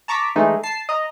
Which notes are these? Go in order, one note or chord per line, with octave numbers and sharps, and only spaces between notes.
A5 A#5 C#6 D6 B6
E3 G#3 A3 D#4
A5 C7
D#5 A#5